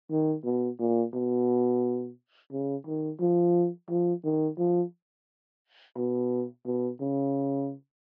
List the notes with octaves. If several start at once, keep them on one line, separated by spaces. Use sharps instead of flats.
D#3
B2
A#2
B2
C#3
D#3
F3
F3
D#3
F3
B2
B2
C#3